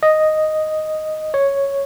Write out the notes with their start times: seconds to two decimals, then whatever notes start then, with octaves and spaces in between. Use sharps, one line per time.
0.03 D#5
1.34 C#5